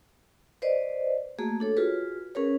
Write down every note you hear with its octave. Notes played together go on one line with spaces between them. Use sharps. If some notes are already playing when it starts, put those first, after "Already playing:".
B4 C5 D5 D#5
A3 A#3 F#4 G#4
D4 A4 C#5
F4 F#4 G#4 B4
C#4 G#4 A#4 B4 C#5